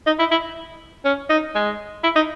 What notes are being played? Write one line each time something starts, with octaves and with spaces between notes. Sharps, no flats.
D#4
E4
E4
C#4
D#4
G#3
E4
D#4